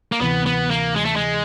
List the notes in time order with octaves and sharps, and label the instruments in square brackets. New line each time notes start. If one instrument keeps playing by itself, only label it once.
[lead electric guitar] A#3
[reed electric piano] D2 C3 E3 [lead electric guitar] B3
[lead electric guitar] B3
A#3
G#3
A3
G#3